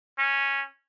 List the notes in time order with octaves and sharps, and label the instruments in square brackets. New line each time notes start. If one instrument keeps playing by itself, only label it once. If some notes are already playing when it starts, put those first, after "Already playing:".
[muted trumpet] C#4